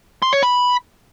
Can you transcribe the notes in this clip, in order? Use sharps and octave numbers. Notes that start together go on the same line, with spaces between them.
C6
C#5
B5